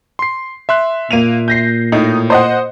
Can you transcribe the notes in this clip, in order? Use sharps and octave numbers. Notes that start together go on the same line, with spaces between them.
C6 C7
E5 C6 F#6
A#2 A#3 D#7 F7
G6 A#6 C7
A2 D#4
C5 D#5 F#5